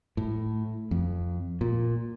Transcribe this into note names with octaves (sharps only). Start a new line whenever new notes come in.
A2
F2
A#2